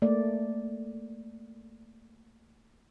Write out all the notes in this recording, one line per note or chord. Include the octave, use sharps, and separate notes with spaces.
A3 A#3 D5